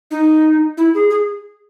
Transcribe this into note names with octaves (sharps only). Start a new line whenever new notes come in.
D#4
E4
G#4
G#4